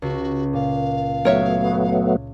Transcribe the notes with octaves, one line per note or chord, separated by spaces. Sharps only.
C#2 F#4
A#2 F5
F#3 A3 B3 A#4 C#5 E5